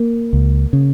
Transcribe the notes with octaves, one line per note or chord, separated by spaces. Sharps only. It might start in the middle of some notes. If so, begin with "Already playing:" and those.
Already playing: A#3
C#2
C#3